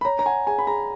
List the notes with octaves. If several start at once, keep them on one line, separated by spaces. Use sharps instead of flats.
B5
C#5 A#5
A#5
F#5 G#5
G#4 G#5
B5
G#4 A#5